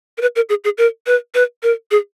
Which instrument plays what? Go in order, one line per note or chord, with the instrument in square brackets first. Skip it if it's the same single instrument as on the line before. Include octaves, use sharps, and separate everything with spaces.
[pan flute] A#4
B4
A#4
G#4
G#4
A#4
B4
B4
A#4
G#4